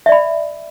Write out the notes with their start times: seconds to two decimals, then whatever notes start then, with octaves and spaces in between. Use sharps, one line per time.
0.06 E5
0.09 D5
0.12 B5